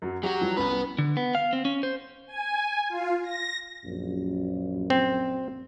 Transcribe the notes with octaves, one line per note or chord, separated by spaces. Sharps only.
F#2 F#3
F#3 F#4 G4
E3 F3 G3
C2 B3 C#4 B4
D3
B3
F5
C4
C#4
C5
G#5
F4
A#6
A#1 F#2
C4